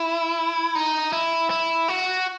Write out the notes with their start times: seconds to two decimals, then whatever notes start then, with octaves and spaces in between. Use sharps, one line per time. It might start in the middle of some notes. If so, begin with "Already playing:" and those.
Already playing: E4
0.75 D#4
1.13 E4
1.50 E4
1.88 F#4